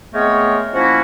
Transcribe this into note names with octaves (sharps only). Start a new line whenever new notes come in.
G#3 A3 B3 C4 A#4 C#5
F3 A#3 C#4 E4 F#4